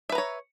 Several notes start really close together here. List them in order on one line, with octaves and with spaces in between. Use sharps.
E5 B4 A#5 C#5